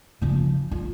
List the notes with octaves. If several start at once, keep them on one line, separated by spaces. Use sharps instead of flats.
C#3 F3
F4